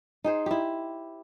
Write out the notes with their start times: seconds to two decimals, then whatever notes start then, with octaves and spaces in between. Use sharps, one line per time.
0.24 D#4 G#4 C5
0.46 E4 G4